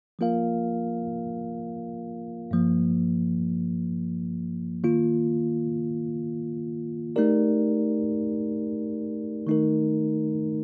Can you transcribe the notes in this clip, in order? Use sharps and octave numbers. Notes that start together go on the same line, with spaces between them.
F3 A#3 F4 A#4 F5
G2 F3 A#3
D#3 A#3 F4
A3 D#4 G4 A#4 D5
D#3 A3 D#4 A#4